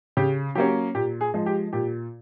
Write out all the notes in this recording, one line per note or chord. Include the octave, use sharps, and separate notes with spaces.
C#3 G4
F#3 A#3 C#4 G4
A#2 G4
G#4
F3 G#3
G4
A#2 G4